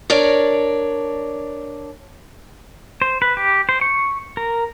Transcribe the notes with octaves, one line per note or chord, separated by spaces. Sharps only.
D4 A#4 C#5 D5
C5
B4
G4
C5
C#6
A#4